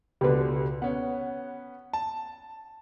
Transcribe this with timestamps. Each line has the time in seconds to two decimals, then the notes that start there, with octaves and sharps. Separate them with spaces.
0.21 C#2 B2 D3 G4 B4
0.82 B3 C#4 F#5
1.93 A5